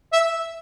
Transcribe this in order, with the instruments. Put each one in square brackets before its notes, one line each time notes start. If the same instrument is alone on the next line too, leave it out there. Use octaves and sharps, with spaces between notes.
[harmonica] E5